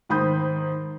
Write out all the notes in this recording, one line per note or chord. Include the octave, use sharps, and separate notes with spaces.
G#2 D#3 C5 B5 D#6 G6